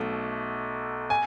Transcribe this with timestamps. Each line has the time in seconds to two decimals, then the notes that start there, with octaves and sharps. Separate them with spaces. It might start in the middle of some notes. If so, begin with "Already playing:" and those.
Already playing: B1 B2 A3
1.10 G#5